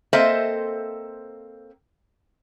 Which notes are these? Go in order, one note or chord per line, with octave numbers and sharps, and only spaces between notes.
A#3 C4 A4 C5 D#5 E5